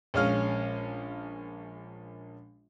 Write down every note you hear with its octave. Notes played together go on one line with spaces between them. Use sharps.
A#1 G#3 C#4 F5 F6